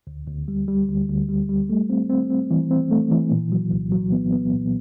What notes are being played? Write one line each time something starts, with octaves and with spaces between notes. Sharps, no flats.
D2
D2
G3
G3
D2
D2
G3
G3
A3
C4
C4
C4
E3
C4
A3
E3
A#2
F#3
C2
F#3
B3
B3
A#2